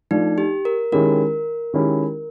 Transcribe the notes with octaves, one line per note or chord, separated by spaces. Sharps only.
F3 A3 D4 D#4
G4
A#4
D#3 G#3 C#4 E4 G4 A#4
D#3 G#3 C#4 E4 G4